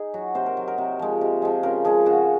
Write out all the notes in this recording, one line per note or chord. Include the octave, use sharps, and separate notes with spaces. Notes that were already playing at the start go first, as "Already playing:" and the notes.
Already playing: D#4 G#4
F#3 F#4
C3 C5
A#4
F#3
A#4
C3
F3 G#3
C3
F3 G#3
C#3 A#4
F3 G#3 G#4
C#3 F#4